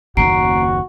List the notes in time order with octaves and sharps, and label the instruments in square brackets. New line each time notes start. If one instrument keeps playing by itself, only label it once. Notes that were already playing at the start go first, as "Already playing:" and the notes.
[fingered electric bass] F#1 D#2 [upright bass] A#3 C#4 [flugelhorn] F#4 [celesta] A#5 C7 D7